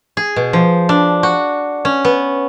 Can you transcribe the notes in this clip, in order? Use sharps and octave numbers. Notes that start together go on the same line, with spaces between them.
G#4
B2
F3
D4
F#4
C#4
B3